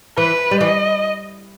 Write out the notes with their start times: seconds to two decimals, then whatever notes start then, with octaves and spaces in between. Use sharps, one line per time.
0.17 E3 B4
0.51 G3
0.60 E3 D#5